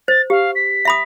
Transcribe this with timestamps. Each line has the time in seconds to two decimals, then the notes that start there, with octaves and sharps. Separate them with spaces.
0.08 C5 A6
0.30 G4 F5
0.55 B6
0.85 E5 B5 D#6